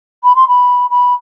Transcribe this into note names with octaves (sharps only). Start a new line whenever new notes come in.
B5
C6
B5
B5